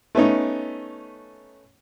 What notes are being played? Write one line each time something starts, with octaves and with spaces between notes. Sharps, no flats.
A3 B3 C#4 D#4